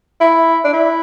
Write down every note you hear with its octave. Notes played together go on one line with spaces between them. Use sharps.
E4
D4
E4